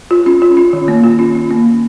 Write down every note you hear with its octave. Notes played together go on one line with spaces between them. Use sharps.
F4
C#4
F4
C#4
D#3
A#3
F4
C#4
C#4
A#3